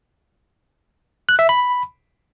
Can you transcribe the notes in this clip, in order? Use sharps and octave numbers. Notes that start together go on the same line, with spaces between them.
F#6
E5
B5